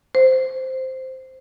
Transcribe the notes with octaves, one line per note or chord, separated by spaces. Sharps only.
C5